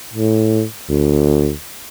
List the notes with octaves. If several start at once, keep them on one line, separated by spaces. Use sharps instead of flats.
A2
D2